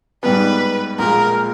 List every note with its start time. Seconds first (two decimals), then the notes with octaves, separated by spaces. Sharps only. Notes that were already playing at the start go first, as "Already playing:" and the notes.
0.23 G#2 G3 B3 B4
0.99 A#1 A#2 G#3 A#4